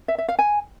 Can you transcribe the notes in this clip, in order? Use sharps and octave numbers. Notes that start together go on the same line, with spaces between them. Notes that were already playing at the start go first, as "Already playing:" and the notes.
E5
E5
F5
G#5